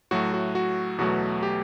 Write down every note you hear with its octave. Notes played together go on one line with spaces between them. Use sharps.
A2 F#3 A3 F#4
F#4
F#4
E2 B2 F#3 A3 F#4
G4